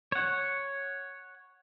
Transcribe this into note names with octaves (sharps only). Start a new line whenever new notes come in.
C#5 F#5